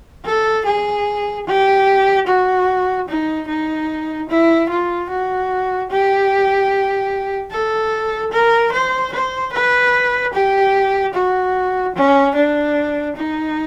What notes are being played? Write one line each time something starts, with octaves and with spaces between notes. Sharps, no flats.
A4
G#4
G4
F#4
D#4
D#4
E4
F4
F#4
G4
A4
A#4
C5
C5
B4
G4
F#4
C#4
D4
D#4